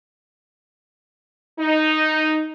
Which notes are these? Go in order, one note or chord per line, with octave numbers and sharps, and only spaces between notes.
D#4